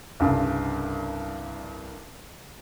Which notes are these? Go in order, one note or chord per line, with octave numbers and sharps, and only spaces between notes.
C2 G2 C#3